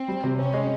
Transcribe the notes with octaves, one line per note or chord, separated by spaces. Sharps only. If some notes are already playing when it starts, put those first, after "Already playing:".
Already playing: C4
G3
C3
C4 C#4
G#3